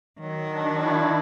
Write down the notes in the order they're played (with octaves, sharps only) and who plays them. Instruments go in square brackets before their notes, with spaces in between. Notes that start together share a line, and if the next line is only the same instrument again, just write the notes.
[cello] D#3 [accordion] F#3
[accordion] D4
E4